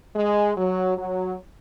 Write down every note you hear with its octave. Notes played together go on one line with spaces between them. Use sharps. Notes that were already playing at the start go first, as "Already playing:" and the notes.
G#3
F#3
F#3